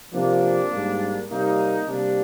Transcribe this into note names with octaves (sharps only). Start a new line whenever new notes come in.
C3 F3 A#3 D4
G#2 G3 A#3
C3 G3 A#3 D#4
C3 G3 A#3 D4